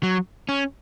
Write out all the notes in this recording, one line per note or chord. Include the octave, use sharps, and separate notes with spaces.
F#3
C#4